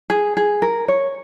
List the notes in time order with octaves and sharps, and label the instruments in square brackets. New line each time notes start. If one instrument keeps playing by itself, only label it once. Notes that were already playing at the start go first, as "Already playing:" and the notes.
[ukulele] G#4
G#4
A#4
C#5